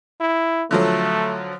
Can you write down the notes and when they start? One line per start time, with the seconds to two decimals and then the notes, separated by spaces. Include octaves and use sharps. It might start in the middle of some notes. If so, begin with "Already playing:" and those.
0.21 E4
0.71 D3 F3 F#3 A3